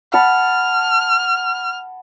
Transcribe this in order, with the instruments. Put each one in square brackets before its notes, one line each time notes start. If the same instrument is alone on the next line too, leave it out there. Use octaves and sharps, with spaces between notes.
[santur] F#5 A5 B5 [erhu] F6